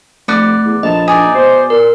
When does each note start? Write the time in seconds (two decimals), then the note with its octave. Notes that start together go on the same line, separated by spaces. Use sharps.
0.28 F1 A3 D5 F#5
0.65 E2
0.83 A#1 A2 D#5 A5
1.08 E3 D4 D#4 G#4 D5
1.34 B2 C5
1.70 A#2 A#4